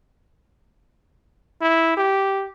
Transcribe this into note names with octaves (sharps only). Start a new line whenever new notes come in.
E4
G4